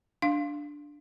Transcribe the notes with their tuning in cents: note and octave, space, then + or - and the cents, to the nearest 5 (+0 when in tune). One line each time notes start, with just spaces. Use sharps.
D4 +0 F5 +0